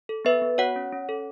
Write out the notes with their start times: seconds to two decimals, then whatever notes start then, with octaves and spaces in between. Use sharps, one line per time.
0.09 A4
0.25 B3 B4 E5
0.42 B3
0.58 F#4 C#5 F#5
0.76 C#4
0.93 C#4
1.09 A4